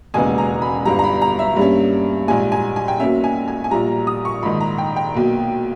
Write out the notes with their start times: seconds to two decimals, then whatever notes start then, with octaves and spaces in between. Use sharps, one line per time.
0.14 E1 D#2 C#3 G#3 B3 G#5
0.38 A#5
0.62 B5
0.85 G1 G2 G3 A#5
0.99 A#5
1.04 B5
1.22 A#5
1.39 E5
1.56 G2 G3 A#3 C#4
2.28 A#1 G#2 G3 G#5
2.52 G#5
2.76 G#5
2.88 G5
3.00 B1 B2 A#3 C#4 E5
3.24 G#5
3.48 G#5
3.64 G#5
3.71 A#1 A#2 G3 A#5
4.07 D#6
4.25 C#6
4.43 A#1 G#2 D#3 B5
4.60 A#5
4.78 G5
4.96 G5
5.14 B1 B2 A#3